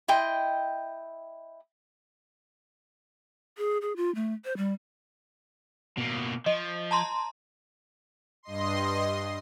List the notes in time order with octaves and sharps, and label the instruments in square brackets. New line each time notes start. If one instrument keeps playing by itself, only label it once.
[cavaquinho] E4 D#5 G5 C6
[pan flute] G#4
G#4
F4
A3
C5
G3
[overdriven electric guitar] B2 A#3
[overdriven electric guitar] F3 [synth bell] D#5
[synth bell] A5 A#5 C6
[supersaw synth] G2 D#5 C6